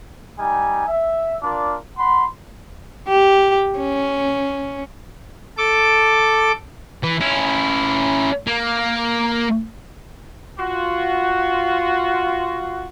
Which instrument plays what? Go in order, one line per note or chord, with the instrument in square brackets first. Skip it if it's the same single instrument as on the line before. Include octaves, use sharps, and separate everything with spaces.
[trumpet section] G3 D#4 G#5
E5
D4 F4 A#4 D5
F#5 B5 C6
[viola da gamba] G4
C#4
[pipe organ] A4 D6
[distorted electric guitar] E3
C#4 E4
A#3
[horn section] F4 F#4